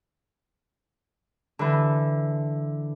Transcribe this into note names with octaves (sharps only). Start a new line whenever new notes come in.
D3 E3